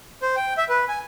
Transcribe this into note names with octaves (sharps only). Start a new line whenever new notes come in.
C5
G5
E5
B4
G#5